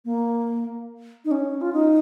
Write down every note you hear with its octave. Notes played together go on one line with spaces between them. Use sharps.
A#3
D#4
C#4
F4
D#4